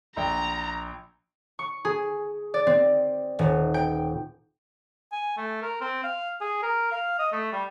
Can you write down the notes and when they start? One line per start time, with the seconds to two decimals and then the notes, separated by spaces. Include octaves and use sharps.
0.17 A#1 G5 A#5
1.59 C#6
1.85 G#4
2.54 D5
2.67 C4
3.39 D#1
3.74 G5
5.12 G#5
5.37 A3
5.62 A#4
5.81 C4
6.04 F5
6.41 G#4
6.63 A#4
6.92 F5
7.19 D#5
7.32 A3
7.53 G3